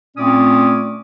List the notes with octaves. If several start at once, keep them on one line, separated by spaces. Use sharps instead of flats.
A#2 A3 C4 C#4 D5 D#6